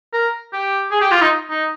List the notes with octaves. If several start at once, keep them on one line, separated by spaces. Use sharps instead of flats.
A#4
G4
G#4
G4
F4
D#4
D#4